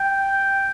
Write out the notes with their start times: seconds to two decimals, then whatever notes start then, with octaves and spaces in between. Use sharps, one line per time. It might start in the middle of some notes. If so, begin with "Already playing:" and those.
Already playing: G5